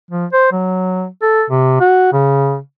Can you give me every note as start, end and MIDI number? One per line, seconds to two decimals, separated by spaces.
0.11 0.25 53
0.33 0.51 72
0.52 1.07 54
1.22 1.44 69
1.50 1.75 48
1.80 2.12 66
2.13 2.58 49